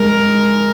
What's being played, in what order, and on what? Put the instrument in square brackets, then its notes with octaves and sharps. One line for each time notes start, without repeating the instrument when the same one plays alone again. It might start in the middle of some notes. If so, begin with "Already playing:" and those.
Already playing: [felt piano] G#3 [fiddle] A#4